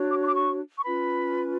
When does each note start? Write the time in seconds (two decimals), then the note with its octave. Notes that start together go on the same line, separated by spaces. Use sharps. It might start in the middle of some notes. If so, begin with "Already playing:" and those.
Already playing: D4 F#4 C#5
0.10 D6
0.21 C#6
0.27 D6
0.35 C#6
0.77 C#6
0.84 C#4 F4 B4 B5